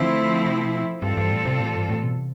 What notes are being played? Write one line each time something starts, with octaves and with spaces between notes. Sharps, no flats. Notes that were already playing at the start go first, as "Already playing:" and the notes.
Already playing: D3 F3 A3 C4 E4
C3
B2
G2 E3 G3 C4 F4 A4
G2
A2
C3
A2
G2
A2
B2
C3